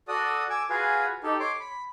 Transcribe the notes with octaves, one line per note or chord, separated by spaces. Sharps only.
F#4 A4 D5 D#6
G#5 D6 E6
F4 F#4 G#4 B4 F5 G#5
D#4 G4 A4
C#5 C6 D6
B5